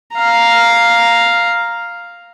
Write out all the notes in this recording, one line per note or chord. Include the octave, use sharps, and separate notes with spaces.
F5 A#5